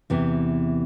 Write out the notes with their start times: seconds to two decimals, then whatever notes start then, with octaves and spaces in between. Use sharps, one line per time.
0.10 E2 C3 E3